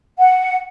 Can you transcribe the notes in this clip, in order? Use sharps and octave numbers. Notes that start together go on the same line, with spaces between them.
F#5